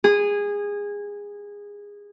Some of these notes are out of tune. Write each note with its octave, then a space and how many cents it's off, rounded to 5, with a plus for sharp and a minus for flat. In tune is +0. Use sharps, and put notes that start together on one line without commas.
G#4 -20